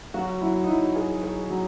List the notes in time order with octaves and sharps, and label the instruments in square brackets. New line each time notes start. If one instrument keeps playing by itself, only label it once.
[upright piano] F#3 [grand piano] F#4
[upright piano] F#3 [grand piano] E4
[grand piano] D#4
[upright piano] F#3 [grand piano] E4
[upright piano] G#4
G#4
F#3